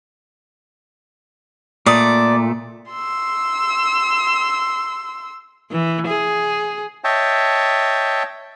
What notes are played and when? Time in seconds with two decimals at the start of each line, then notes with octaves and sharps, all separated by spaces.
1.86 A#2 A3 D5 D#6
2.91 C6 E6
5.71 E3
6.07 G#4
7.04 C#5 D#5 E5 G5 A5